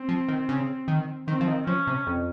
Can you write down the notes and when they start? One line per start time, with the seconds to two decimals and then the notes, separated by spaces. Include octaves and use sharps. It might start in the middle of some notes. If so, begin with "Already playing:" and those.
Already playing: C4
0.09 F3
0.28 D#3
0.49 C#3
0.88 D#3
1.28 D#3 C4
1.41 F3
1.47 D#3
1.67 F3 C#4
1.87 C3
2.07 F2